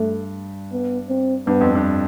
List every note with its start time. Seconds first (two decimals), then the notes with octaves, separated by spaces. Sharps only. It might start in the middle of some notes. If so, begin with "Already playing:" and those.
Already playing: G2 A3
0.72 B3
1.09 C4
1.47 G2 B3
1.61 F2
1.75 G2